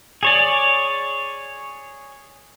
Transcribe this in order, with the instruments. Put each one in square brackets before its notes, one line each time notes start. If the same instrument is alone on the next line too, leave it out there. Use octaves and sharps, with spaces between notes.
[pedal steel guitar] G#4 C#5 D5